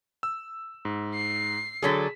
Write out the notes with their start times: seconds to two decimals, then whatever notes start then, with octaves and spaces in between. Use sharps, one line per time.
0.23 E6
0.85 G#2
1.15 C7
1.82 D3 F#3 G#4 A4 B6